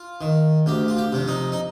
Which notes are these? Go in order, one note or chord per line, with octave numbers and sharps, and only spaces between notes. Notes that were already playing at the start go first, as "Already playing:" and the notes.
Already playing: F4
D#3
D2 G4
F4
G4
C3 F3
D#4
D#4